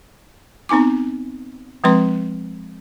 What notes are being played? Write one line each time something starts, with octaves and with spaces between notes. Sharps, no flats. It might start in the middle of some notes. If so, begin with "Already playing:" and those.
B3 C4 D#4 G#5 D6
F3 G#3 C4 B4 C6